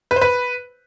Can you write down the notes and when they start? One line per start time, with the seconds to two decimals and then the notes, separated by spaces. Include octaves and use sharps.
0.11 B4
0.16 C5
0.22 B4